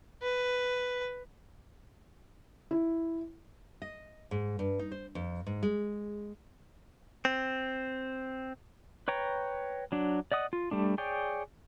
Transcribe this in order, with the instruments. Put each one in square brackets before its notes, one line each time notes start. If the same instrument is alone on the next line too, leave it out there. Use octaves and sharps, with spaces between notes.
[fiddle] B4
[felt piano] E4
[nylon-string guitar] D#5
G#2
G2
D#4
C5
F2
G#2
G#3
[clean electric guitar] C4
[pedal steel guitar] B4 C#5 G5 A#5
F#3 D4
D5 D#5 F#5 D#6
F4
G3 A3 D4
G#4 C#5 D5 G5